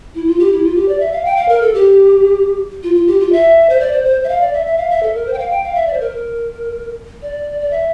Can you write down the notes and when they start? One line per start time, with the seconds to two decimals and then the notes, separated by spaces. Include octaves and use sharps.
0.15 E4
0.27 F4
0.39 G4
0.52 E4
0.64 F4
0.76 G4
0.88 D5
1.00 E5
1.12 F5
1.25 G5
1.36 F5
1.49 A#4
1.62 A4
1.74 G4
2.83 F4
2.95 F4
3.07 G4
3.20 F4
3.32 E5
3.69 C5
3.80 D5
3.92 C5
4.04 C5
4.24 E5
4.29 F5
4.41 D5
4.53 E5
4.66 E5
4.77 F5
4.90 E5
5.03 A4
5.14 A#4
5.26 C5
5.33 G5
5.39 F5
5.50 G5
5.64 F5
5.75 E5
5.87 D5
5.93 C5
6.00 A#4
6.11 A#4
7.22 D5
7.61 D5
7.71 E5